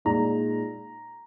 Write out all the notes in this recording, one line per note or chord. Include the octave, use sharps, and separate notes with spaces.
A#2 G#3 D#4 A#5